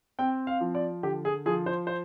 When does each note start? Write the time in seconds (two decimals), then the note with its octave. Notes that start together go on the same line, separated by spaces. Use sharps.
0.19 C4 G5
0.47 F5
0.61 F3
0.75 D5
1.03 D3 G4
1.25 G#4
1.46 F3 G#4
1.66 C5
1.87 C5